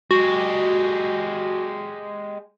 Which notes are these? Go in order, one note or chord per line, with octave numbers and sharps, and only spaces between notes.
G#3 F#4 G4